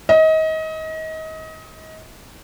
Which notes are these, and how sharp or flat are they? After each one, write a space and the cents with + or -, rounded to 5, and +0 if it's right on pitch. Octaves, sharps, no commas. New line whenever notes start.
D#5 +30